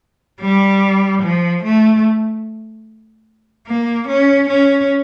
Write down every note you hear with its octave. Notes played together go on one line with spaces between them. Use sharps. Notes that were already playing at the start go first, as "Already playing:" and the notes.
G3
F3
A3
A#3
C#4
C#4